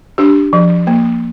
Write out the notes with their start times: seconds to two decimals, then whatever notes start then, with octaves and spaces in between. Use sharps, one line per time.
0.18 D4 G4
0.53 F3
0.87 A#3